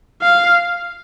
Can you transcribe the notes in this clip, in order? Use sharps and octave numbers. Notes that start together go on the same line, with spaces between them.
F5